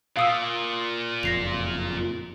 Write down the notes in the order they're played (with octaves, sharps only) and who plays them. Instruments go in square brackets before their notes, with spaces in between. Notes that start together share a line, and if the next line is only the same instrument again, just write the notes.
[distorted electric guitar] A#2 [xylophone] F5 D#6 E6
[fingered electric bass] F#1 F2 [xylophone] A#6 C7 F7